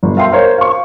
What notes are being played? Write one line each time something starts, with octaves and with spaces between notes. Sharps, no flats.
G1
E5 F5 G5 C6
A#4 C5 C#5
F5 C#6